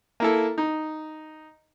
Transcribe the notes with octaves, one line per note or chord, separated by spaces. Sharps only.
A#3 E4 A4
D#4